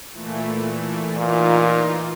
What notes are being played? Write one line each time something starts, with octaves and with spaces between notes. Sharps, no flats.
A#2 E3 A3
A#2 E3 D#4 F4